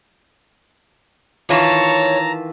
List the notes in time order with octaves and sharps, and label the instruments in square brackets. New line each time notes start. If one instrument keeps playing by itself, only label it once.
[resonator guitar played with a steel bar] D#3 E3 F4 [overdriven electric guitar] C#5 [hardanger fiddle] A5 [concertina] A#5